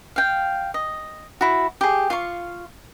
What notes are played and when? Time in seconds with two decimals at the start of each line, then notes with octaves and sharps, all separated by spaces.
0.16 F5 G5
0.74 D#5
1.41 E4 F#4
1.81 G4 G#4
2.10 F4 F5 C#6